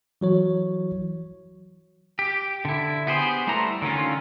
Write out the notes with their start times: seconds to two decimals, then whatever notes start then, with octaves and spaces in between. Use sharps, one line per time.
0.21 E3 F#3 C#5
2.19 G4
2.65 D3 E4
3.07 B3 G4 G#4 C5
3.47 G3 A3 E4 C5 A#5
3.82 D3 D#3 C#4 F4